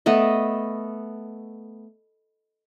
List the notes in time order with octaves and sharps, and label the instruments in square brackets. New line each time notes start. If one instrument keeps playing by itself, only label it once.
[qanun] A3 B3 D#5